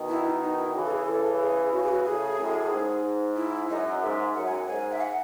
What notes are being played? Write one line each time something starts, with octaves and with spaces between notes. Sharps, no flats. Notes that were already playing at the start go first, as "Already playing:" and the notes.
Already playing: B2 D#3
E4
D#4
D#4
E4
C#3 E3 F#4
A4
G#4
C#3 E3 A4
G#4
C#3 E3 F#4
G#4
F#4
A2 C#3 G#4
F#2 A2
G#2
E4
F#2 D#5
G#2 E5
F#2 F#5
G#5
F#5
G#2 G#5
E5
F#5